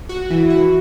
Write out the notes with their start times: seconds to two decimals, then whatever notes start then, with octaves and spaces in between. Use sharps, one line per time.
0.09 F#4
0.30 E3 E4
0.50 F#4